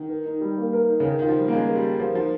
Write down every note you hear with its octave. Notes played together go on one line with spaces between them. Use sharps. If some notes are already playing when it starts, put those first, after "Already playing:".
Already playing: D#3
A#4
D#4
G3
A#3
A#4
D#4
C#3
D#3 A#4
D#3 F4
F3
G3
A#3
G#3 C#4
A#4
G3
F4
F3 A#4
F3 D#4